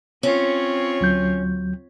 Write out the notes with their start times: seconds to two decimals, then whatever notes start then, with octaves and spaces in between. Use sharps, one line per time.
0.23 C4 C#4 F4 C#5
1.01 D2 F#3 G6